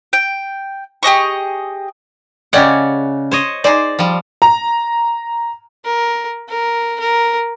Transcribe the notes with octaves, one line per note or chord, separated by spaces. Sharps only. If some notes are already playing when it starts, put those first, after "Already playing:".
G5
G4 G#4 D#5 C#6
C#3 G#3 C#4 G4 D5 F#5
C5 C#5 D#5
D#4 G#4 C5 D5
F3 G3
A#5
A#4
A#4
A#4